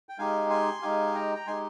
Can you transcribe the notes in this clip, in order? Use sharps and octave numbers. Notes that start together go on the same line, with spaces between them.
G5
G#3 D#4 G4 F5 G#5
G#5 C6
G#3 D#4 G4 F5 G#5
G5 A#5
A#5
G#3 D#4 G4 G#5 C6